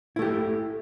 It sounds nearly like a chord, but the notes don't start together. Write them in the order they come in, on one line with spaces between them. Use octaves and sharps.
E4 A3 G4